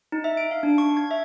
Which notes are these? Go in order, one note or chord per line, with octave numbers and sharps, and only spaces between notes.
D#4
E5
D7
F5
D4
C#6
G#6
E5